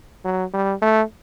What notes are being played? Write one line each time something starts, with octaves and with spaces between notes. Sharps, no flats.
F#3
G3
A3